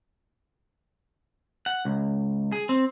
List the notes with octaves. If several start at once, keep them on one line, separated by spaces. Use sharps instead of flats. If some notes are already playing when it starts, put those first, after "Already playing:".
F#5
C#2
G#4
C4